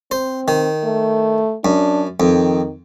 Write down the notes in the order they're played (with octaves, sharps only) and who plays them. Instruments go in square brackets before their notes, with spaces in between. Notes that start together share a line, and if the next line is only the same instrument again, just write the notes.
[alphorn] C4 [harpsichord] C5
[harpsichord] D#3
[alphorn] A3
[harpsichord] F#2 [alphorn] D4
[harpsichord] F2 [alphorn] D#3